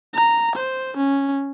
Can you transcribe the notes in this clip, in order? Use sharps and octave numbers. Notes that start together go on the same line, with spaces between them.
A#5
C5
C#4